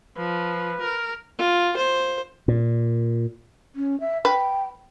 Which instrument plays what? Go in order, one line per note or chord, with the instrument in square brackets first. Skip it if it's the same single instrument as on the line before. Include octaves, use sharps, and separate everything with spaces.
[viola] F3 [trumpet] B4
[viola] A#4
[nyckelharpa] F4
C5
[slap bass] A#2
[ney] C#4
E5
[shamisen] B4 [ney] G5